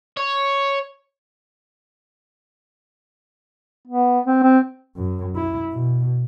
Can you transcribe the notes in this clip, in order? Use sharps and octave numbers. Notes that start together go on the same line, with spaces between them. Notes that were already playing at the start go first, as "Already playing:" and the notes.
C#5
B3
C4
C4
F#2
E4
B2